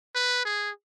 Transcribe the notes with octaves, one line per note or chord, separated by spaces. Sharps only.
B4
G#4